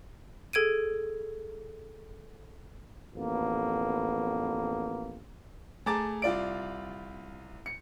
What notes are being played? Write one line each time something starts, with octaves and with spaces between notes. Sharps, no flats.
G#4 A4 G#6 D7 D#7
A1 F2 A#3 B3
A3 G#4 A5 A#5 D6 A6
C2 F4 D5 D7
C#7